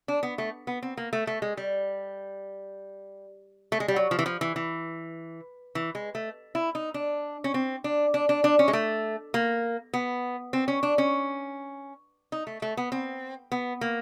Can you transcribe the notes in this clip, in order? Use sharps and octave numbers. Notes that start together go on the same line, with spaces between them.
D4
B3
A3
B3
C4
A#3
A3
A3
G#3
G3
A3
G#3
G3
F#3
F3
E3
F3
E3
E3
E3
G#3
A3
E4
D#4
D4
C#4
C4
D4
D4
D4
D4
C#4
G#3
A3
A#3
B3
C4
C#4
D4
C#4
D#4
A3
A3
B3
C4
B3
A#3